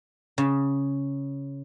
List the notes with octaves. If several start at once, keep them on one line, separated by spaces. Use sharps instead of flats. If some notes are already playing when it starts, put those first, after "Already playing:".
C#3